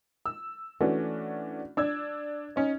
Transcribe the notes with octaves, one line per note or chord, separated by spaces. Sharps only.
E6
E3 A3 C#4 D4 F#4
D4 E6 G#6
C#4 D#4